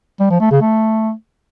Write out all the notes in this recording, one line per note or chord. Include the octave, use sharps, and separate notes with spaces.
G3
F3
A3
C#3
A3